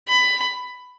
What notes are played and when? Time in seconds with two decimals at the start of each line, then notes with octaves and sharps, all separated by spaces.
0.08 B5